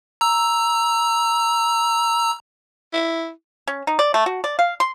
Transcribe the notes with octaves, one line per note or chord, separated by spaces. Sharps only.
A#5 E6
E4
C#4
D#4
D5
A3
F#4
D5
F5
C6